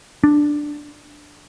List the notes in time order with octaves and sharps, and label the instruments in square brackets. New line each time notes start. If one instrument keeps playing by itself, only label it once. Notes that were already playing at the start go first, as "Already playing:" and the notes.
[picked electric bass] D4